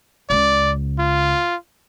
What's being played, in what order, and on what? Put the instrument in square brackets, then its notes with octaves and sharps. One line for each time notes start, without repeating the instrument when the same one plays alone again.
[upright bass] C#2 C#3 [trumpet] D5
[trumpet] F4